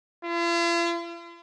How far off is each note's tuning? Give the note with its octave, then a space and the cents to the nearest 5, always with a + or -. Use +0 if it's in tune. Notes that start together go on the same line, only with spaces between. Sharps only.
F4 -45